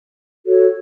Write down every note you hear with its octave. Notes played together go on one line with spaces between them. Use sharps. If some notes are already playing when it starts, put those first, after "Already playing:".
F#4 A4 C#5